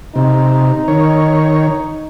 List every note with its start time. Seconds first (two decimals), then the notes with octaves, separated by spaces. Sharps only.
0.15 C3 D#4
0.88 D#3 C#5